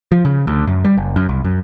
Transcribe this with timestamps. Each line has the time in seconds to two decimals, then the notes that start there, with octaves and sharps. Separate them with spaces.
0.12 F3
0.25 C#3
0.47 D2
0.67 F#2
0.85 G3
0.98 F#1
1.16 F#2
1.29 C2
1.44 F#2